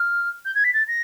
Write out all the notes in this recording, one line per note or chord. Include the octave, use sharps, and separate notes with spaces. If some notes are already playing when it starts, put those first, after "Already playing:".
Already playing: F6
G6
G#6
B6
A6
A#6